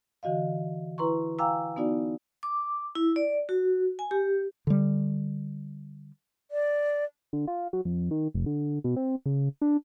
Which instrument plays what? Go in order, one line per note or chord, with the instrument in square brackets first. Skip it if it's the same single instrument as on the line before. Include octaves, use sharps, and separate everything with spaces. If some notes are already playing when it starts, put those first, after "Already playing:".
[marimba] D3 E3 F#4 D#5 F5
E4 B4 A#5 C6 C#6
F5 G5 G#5 A#5 D6 E6
B3 D#4 F#4 D5
[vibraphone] D6
E4
D5
F#4
G#5
G4
[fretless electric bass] D3 G3
[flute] D5
[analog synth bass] D3
F4
F#3
F2
D#3
F1
D3
B2
C4
C#3
D4